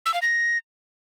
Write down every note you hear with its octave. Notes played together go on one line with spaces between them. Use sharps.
E6
F5
A#6